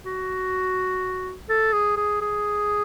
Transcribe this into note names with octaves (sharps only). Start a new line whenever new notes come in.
F#4
A4
G#4
G#4
G#4